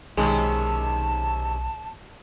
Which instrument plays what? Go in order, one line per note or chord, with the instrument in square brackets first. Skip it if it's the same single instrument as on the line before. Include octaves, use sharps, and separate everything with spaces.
[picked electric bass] B1 [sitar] C3 D#3 C#4 [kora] G#3 [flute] A5